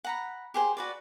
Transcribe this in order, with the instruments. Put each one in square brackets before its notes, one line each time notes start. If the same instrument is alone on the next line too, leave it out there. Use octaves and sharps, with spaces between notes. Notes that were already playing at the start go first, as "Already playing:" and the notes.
[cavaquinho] F#5 A#5 B5
G4 G#4 C5
F#4 B4 D5